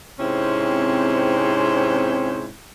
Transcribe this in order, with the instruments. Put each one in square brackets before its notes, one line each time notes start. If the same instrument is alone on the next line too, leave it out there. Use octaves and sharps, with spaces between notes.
[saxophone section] G#2 C3 C4 C#4 E4